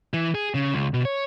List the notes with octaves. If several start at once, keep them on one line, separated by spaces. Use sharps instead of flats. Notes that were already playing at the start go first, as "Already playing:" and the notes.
E3
G#4
C#3
C#2
B2
C#5